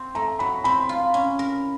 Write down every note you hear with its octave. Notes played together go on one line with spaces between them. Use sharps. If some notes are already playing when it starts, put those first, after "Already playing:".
Already playing: C4
A3 A#5
F#3 B5
C4 B5
F4
C#4
A#4